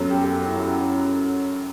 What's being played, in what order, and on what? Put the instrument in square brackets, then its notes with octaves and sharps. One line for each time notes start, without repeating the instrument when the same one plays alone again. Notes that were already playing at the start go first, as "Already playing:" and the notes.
Already playing: [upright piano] F#2 F#3 B3 A4
G4
G4
F#4
E4
F#4
G4
F#4